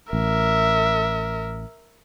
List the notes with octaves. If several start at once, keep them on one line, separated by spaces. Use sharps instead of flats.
A1 A#4 E5